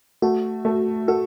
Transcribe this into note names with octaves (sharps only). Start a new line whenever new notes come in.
A3 F#4
A3
F#4 A4